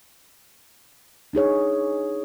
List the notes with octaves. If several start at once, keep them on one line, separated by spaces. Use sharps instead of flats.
D4 D#4 G#4 C#5